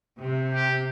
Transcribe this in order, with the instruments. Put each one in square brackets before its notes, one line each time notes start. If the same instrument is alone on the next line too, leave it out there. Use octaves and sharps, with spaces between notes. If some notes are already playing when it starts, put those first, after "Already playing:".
[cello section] C3
[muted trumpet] G4